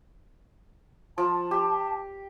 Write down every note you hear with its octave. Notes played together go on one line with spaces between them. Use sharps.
F3 A5
G4